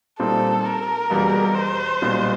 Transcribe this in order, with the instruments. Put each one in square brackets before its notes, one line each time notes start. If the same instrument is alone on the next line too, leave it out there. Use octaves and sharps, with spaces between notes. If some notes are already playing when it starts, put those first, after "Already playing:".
[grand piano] A#2 G3 C4 D#4 [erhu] A4
[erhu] A#4
[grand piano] E1 E2 B2 G3 A#3
[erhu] C5
[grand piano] B1 A#2 G3